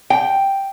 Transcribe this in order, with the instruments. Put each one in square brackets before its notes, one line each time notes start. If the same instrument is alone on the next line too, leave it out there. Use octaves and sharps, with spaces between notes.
[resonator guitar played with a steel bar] G5